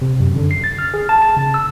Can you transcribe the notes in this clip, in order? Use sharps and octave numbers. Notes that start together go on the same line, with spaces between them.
C3
F#2
D3
C7
A6
F6
G#4
A5
A5
C#3
E6